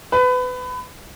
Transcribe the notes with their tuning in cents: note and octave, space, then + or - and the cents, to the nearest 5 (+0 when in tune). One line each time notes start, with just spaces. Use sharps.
B4 +25